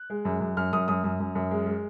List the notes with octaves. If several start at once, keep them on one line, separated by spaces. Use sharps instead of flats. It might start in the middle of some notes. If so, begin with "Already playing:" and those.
Already playing: F#6
G#3
F#2
F#2
F#2 F6
F#2 D#6
F#2 D#6
F#2
F#2
F#2
G#3
G#3